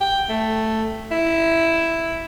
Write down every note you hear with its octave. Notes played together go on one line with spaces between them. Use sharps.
G5
A3
E4